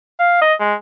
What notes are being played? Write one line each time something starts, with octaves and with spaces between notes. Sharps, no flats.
F5
D#5
G#3